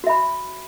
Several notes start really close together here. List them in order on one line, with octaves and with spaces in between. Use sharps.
F#4 E5 B5